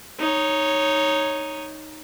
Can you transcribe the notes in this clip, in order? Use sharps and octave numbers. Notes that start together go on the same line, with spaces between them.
D#4 C#5